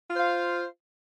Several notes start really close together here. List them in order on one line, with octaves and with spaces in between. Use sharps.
F4 C5 F5